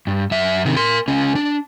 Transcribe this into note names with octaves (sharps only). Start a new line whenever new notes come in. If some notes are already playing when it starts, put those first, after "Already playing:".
G2
F#2 E5
C3 D#3
A#4 C6
C#2 C#4
D4